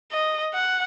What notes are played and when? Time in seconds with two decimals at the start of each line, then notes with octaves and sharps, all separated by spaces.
0.12 D#5
0.54 F#5